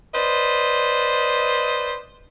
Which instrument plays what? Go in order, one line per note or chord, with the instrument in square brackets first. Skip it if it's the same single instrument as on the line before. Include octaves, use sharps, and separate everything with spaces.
[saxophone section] B4 C5 D5 D#5